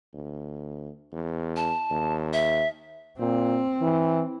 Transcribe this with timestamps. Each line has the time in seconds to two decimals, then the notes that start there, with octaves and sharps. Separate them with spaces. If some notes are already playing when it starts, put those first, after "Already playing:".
0.14 D2
1.12 E2
1.56 A5
1.90 D#2
2.33 E5
3.19 A#2 C4
3.82 E3